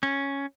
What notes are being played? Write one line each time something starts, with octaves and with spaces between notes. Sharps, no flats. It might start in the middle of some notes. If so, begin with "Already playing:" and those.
C#4